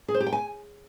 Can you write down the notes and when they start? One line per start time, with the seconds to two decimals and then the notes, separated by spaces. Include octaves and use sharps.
0.08 G#4
0.14 C5
0.20 G4
0.26 G5
0.32 G#5